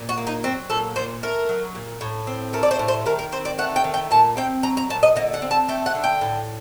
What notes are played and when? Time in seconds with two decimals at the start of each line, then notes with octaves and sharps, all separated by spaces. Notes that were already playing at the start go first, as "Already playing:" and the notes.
Already playing: A#2
0.09 F#4
0.17 A#3
0.27 D#4
0.43 F#3 C4
0.70 A#2 A4
0.96 A#2 C5
1.23 A3 A#4
1.49 F#3
1.75 A#2
2.01 A2
2.27 C4
2.53 A3 A#4
2.63 D5
2.71 C5
2.79 A2
2.88 C5
3.06 D#3 A#4
3.19 A#4
3.32 C4 C5
3.45 D5
3.58 A3 F#5
3.76 G5
3.84 D#3
3.94 G5
4.11 A#2 A5
4.37 C4 G5
4.63 F#3 A#5
4.77 A#5
4.89 A#2 A5
5.03 D#5
5.16 D3 D#5
5.34 F#5
5.42 C4
5.51 A5
5.68 A3 G5
5.86 F#5
5.95 D3
6.04 G5
6.21 A2